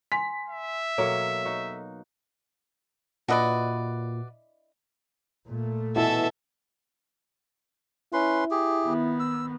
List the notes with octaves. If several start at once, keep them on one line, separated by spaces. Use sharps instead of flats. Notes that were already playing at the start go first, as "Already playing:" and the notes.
G#5 C6 B6
E5
B2 F#3 A#3 A4 C#5
D#4 F#4
A#2 D4 E4 F#4 B4 D5 D#5
A#2 A3
B2 E3 E4 A4 E5
C#4 E4 B4 C6
G4 G#4
D#3 B3
E6